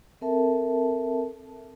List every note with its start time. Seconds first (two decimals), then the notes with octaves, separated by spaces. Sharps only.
0.21 C4 A4 A#4 E5 A5